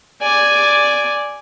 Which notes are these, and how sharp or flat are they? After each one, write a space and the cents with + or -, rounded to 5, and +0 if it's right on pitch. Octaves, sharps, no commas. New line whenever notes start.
D5 +0 G#5 +0